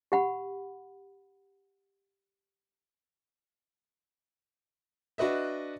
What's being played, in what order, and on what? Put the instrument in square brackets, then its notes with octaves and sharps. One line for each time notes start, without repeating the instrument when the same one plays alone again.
[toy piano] G4 F#5 B5
[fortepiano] D4 F#4 B4 D#5 E5